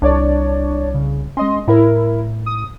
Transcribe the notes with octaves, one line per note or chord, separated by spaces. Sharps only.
C2 D4 C#5 D5
C#3
G#3 C#4 D#5 C6
A2 E4 A#4
D#6